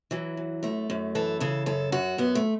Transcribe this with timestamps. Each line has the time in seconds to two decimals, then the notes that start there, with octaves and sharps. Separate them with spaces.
0.11 E3 F#3
0.37 F#2
0.63 F#2 A3
0.90 F#2
1.15 E3 A4
1.40 C#3 A4
1.66 F#2 A4
1.92 F#2 F#4
2.18 F#2 B3
2.35 A3